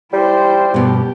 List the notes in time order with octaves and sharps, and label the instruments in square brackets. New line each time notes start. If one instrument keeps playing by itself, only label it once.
[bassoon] G3 [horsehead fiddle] E4 C5
[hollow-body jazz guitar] G2 B2 [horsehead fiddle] G4